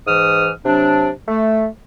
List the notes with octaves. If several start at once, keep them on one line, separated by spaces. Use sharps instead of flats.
G#2 E3 D#6 F6
C3 F#3 D4
A3